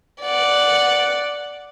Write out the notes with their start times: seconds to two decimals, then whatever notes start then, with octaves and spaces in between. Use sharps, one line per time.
0.22 D5 F#5